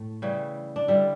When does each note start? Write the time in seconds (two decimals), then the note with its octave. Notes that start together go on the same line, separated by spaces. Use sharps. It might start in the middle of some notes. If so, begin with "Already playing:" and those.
Already playing: A2 A3
0.22 C#3 E3 G3 E4
0.76 D4
0.88 D3 G3 E4